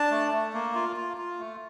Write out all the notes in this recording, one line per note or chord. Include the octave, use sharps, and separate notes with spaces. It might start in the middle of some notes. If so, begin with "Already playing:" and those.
Already playing: D4 A5
A3
A3
A#3
F4
F4
F4
A3